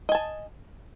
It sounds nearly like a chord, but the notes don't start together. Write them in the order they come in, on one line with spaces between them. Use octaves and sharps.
D#5 G#5 A5